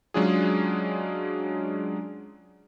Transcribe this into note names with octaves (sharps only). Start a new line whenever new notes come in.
F#3 G#3 C#4 D4 F4 G#4